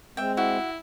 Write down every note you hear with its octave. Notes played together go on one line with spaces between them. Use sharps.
G#3 C4 E5 G5
E4 F#4